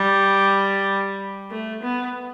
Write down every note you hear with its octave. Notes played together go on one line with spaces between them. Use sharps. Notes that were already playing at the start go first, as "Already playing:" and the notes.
Already playing: G3
A3
B3